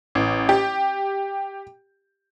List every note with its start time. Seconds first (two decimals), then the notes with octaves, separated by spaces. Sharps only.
0.15 A1
0.49 G4